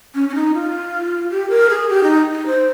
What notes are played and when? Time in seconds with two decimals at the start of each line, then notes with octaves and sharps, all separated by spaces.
0.15 C#4
0.29 C#4
0.35 D#4
0.54 F4
1.31 G4
1.50 A#4
1.70 G#4
1.89 G4
2.03 D#4
2.32 D#4
2.47 C5